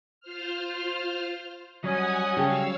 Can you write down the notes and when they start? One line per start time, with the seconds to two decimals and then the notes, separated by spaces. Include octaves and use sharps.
0.20 F4 C5 F6
1.84 F#3 G3 C#4 D#5 F#5 G#5 D#6
2.37 C#3 G4 A4 C#5 F5 E6